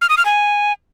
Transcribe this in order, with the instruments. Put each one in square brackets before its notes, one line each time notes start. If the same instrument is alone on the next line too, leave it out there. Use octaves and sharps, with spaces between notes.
[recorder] F6
D#6
F6
G#5